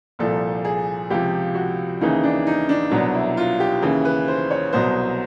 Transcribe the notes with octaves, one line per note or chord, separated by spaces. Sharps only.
C2 A#2 F3 A4
G#4
C#2 C3 F3 G4
F#4
D#2 C#3 E3 D#4
D4
D#4
D4
C2 B2 F#3 D4
E4
F4
G4
D#2 C#3 E3
B4
C5
C#5
C2 B2 F#3 C5